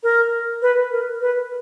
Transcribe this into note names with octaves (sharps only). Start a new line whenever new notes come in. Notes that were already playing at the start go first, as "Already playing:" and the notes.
A#4
B4
A#4
B4